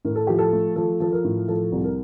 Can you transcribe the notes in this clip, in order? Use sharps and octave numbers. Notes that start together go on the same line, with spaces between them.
A2 A#4
A4
F3 G4
A4
A3
F3 A4
F3 A4
A#4
A2
F3 A4
C2
A#4